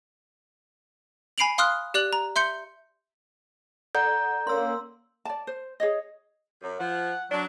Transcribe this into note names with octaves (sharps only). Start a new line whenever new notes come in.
G#5 B5 C7 D7 F7 F#7
F5 C6 D#6 F6 F#6
G4 D5 F#6 F#7
A#5
E5 C6 G6 C#7
A4 D5 F#5 A#5 G6
A#3 C#4 C6 E6
D5 A5
C5
G#4 C#5 D#5
F#2
F3 F#5
F#3 D4